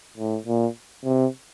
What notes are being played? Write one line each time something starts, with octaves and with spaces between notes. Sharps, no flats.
A2
A#2
C3